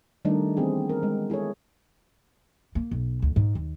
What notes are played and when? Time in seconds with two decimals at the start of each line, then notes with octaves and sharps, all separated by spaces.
0.25 D#3 G3 A3 D4 D#4
0.57 E3 B3 C4 G#4
0.89 A#4
1.03 G#3
1.30 E4 G#4 A4 C#5
2.75 A#3
2.91 B1
3.22 D2
3.36 G#2
3.55 D#2